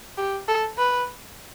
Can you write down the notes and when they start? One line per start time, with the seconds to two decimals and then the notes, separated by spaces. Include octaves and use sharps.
0.17 G4
0.48 A4
0.78 B4